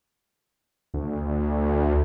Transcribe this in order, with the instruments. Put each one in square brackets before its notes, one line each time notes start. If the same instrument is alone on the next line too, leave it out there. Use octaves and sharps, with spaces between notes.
[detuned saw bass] D2